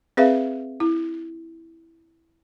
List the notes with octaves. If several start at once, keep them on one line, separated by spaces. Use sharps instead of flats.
C4 G#4 B4 E5 F5
E4